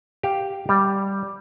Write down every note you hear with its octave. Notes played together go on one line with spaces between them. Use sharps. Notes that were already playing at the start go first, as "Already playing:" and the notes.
G4 F5
G3